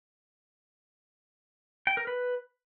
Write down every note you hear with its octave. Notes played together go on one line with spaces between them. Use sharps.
G5
A#4
B4